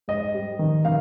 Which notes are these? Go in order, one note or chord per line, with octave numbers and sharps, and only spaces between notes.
G#2 D#5
G3
D#3
D#3 F5